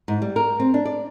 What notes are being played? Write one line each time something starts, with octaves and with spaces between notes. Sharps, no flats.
G#2
G3
A#4
C4
D4
D5